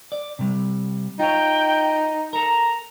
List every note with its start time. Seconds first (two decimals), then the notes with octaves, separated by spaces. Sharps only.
0.12 D5
0.39 C3 G3
1.19 D#4 F4 C#5 G5
2.33 A4 A#4 A#5